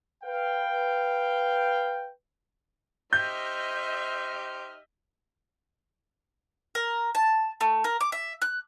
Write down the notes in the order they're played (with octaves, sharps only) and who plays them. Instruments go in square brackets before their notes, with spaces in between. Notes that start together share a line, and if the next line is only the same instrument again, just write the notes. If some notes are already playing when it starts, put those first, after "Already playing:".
[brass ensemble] B4 F5 G5
[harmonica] D#4 G4 F6 [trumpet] C5 [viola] D#5 E5 [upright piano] G6
[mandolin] A#4
A5
A3
A#4
D6
E5
F#6